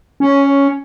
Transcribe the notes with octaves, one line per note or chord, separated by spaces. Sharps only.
C#4